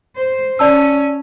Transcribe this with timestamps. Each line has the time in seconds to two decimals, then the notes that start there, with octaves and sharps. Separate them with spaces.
0.16 C5
0.59 C#4 D5 A5 E6